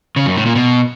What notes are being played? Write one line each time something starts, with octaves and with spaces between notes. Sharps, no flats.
C#3
F#2
A2
A#2
B2